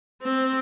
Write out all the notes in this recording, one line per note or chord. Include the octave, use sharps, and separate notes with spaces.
C4